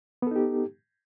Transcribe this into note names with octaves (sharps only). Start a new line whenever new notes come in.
B3 D#4 G4 A4